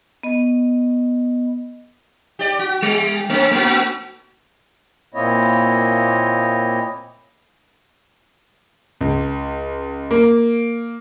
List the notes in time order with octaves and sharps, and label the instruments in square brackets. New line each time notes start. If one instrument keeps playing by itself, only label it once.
[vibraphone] B3 D#5
[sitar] G4 D5
F#4
G3
A3 C4
A3 B3 F#4
[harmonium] A#2 A#3 C4 E4 C#5 D#5
[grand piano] C#2
A#3